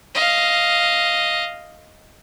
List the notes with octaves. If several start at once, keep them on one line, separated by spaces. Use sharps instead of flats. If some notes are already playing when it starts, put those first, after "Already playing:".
D#5 F5